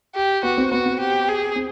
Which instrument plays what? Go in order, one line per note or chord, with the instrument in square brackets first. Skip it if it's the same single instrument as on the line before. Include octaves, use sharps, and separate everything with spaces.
[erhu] G4
[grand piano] B3 [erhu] F#4
[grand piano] C4
[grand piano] B3 [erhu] F#4
[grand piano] C4
[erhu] G4
G#4
[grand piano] C4